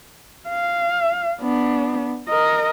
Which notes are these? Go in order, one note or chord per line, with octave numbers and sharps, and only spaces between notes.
F5
B3 D4
A#4 D#5